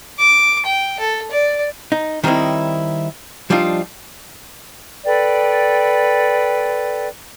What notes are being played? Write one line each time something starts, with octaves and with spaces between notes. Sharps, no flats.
D6
G5
A4
D5
D#4
D#3 G3 C4 D#4 E4
F3 G3 D4 D#4 F4
A4 B4 D5 G5